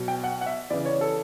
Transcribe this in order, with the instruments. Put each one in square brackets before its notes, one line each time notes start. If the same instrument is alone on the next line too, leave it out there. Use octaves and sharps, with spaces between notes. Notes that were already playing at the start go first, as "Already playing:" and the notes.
Already playing: [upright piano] B2 F#3
G5
F#5
F#5
E5
C#3 E3 D5
C#5
A4